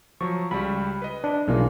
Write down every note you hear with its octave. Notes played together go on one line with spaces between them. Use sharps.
F3 F#3 C#6
C#2 G3 B5
B4 D#5
D4
B1 C#3 E3 A#3 F4